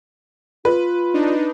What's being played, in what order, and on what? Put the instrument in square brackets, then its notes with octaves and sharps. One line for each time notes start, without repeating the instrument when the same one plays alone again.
[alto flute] F4 [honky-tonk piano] B4
[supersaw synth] D4 D#4